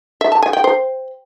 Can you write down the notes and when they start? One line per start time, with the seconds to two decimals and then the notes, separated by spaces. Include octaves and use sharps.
0.21 E5
0.32 A5
0.42 G#5
0.53 G5
0.64 C5